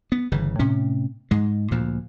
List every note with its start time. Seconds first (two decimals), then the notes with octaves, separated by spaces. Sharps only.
0.12 B3
0.32 G1 C#3 E3
0.59 A2 C3 C#4
1.31 G#2 G#3
1.71 D2 A#2 F3